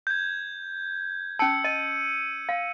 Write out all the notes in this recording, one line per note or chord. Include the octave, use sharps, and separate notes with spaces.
G6 G#6
C#4 A5 E6 C#7
D#5 D#7
F5